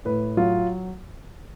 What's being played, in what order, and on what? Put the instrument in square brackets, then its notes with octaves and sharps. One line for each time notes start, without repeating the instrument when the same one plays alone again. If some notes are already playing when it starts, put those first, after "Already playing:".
[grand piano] A2 B4
F#3 F4